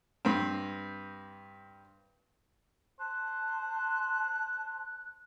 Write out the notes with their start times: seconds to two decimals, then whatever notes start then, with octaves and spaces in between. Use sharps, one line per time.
0.25 G2 C4
3.00 C5 A5 F#6